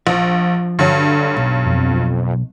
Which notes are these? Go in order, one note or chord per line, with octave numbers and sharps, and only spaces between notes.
A#1 F3
G2 D3 F#3
B1
F2